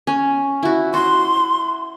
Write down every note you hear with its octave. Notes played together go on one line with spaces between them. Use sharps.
C#4
E4 F#4
F#4 C6